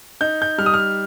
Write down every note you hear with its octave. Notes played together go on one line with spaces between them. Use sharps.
D#4 G6
G6
G3 F6
D#6
F6